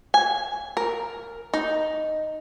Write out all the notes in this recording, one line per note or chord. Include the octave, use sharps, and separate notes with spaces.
G#5
A#4
D#4